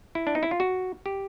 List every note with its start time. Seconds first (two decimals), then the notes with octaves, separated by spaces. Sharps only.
0.15 E4
0.27 D4
0.35 D#4
0.43 E4
0.51 F4
0.60 F#4
1.06 G4